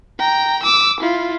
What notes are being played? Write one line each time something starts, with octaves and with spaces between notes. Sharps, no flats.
G5 A#5
D6 E6
E4 F4